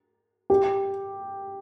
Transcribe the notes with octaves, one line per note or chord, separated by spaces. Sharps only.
G4